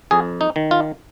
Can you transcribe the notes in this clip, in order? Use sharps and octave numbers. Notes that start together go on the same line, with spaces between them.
F2 G#4
D#4
D#3
F4